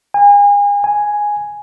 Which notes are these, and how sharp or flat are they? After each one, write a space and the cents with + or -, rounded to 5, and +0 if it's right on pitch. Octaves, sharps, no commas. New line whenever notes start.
G#5 -35
G#5 +0